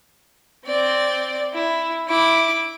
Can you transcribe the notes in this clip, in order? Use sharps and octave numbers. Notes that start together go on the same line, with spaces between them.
C4 D5
E4
E4 D6